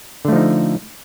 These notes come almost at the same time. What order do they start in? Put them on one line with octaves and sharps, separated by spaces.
D3 A3 F3 D#4